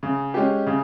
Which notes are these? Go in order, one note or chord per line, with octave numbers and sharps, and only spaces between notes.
C#3
G#3 C#4 G4
C#3